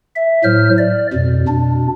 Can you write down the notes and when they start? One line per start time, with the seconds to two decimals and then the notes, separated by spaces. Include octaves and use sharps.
0.16 E5
0.44 A2 F#3 C5 F6
0.78 D5
1.13 F2 B2
1.48 B2 D4